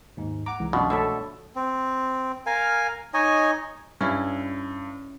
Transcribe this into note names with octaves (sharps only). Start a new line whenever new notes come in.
D#2 G#2
F#5 A#5 D6
C2 E3 G#3
F#2 B2 D4 F4
A3 A4 C#5 E5
C4
A#4 F5 G#5
D#4 C#5 D#5 G#5
G2 C#4 E4